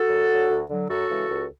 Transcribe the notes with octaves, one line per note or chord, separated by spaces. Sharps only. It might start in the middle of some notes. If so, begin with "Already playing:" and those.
Already playing: F#4 A4
F#2
D3 F#3
D2
D3 F#3
F#2 F#4 A4
C#3 E3 G#3
C#2